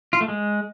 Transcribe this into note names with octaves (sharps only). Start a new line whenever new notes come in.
F4
A3
G#3